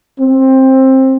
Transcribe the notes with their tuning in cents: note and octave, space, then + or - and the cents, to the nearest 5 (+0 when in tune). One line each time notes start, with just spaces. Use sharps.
C4 +15